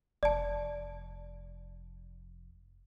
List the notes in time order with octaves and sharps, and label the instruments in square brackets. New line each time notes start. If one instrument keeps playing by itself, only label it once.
[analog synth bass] F1 [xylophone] D5 A5